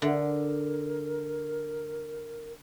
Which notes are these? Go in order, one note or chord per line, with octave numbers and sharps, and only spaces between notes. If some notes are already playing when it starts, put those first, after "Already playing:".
D3 A#4